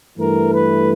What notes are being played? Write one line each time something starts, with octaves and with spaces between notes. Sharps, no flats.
G2 E3 A3 A#4
B4